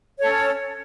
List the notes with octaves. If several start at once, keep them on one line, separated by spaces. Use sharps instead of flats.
C#4 A4 C#5